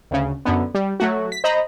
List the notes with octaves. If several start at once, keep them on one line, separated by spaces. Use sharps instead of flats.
D2 C#3
F#2 D3 B3
G3
F#3 A3 F#4
B6
C5 D#5 A#5 B5